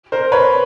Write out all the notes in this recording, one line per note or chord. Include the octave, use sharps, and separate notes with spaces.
A#4 C5
B4 C#5